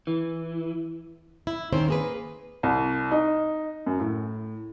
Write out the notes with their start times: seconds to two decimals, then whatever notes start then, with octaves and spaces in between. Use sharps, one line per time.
0.07 E3
1.47 E4
1.73 D#2 D#3 C4 C#4 C5
1.88 A#3 G#4 B4
2.63 C2
3.11 D#4
3.86 F#2
4.00 A2